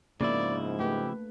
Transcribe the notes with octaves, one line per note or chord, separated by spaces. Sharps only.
G#2 C#3 F3 A#3 B3 D4 E4 D5
A3 G4 B4